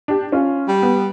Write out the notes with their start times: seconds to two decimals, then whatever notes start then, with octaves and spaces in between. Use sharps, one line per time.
0.08 D4 G4
0.32 C#4 F4
0.68 G3
0.83 B3